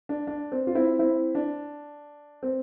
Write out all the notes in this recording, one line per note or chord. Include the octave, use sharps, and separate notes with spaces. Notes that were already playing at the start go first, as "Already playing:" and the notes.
D4
D4
C4
F4
C4 E4
C4 E4
D4
C4